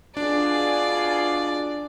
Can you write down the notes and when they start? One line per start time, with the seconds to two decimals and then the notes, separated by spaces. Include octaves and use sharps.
0.17 B2 D4 F4 G#4 D5